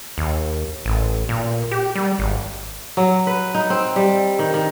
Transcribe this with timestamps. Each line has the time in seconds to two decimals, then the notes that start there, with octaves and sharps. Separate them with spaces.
0.18 D#2
0.85 A1
1.29 A#2
1.71 G4
1.95 G3
2.19 G#1
2.97 F#3
3.27 B4
3.54 D#4
3.70 C4
3.96 G3
4.39 D#3
4.54 D#3